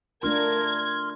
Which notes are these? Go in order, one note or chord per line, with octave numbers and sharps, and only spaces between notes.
A3 D4 F4 A#4 C6 F6 G#6